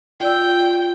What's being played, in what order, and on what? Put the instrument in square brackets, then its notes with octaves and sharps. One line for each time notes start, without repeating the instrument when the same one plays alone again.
[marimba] F4 D5 E6 [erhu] G5